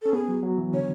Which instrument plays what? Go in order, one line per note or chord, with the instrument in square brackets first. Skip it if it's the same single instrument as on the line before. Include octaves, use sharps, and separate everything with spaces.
[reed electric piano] C#4 [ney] A4
[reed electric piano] B3 [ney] G#4
[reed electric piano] F#3
F#3
E3
[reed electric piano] D3 [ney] C#5